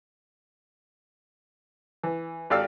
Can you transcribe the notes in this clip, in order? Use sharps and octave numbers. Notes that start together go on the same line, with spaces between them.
E3
G#1 G4 A4 D5 F5 E6